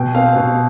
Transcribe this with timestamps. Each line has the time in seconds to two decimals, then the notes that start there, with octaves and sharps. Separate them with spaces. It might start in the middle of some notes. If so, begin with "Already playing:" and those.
Already playing: B2 G5
0.15 C4 F5
0.36 B2 F5